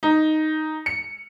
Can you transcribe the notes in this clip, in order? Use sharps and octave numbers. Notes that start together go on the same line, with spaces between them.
D#4
C#7